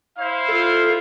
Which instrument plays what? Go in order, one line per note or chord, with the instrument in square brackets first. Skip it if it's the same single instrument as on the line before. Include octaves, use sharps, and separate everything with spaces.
[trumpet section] E4 C5 F5
[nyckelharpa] F4 [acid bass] A4